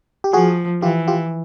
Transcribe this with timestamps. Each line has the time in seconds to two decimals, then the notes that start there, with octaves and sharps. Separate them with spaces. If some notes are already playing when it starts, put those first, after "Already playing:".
0.24 G4
0.33 F3 F#4 G#4
0.82 E3 F4 G4
1.08 F4 G4